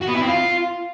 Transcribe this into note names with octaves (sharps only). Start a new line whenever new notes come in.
F#4
B3
E4
C4
F4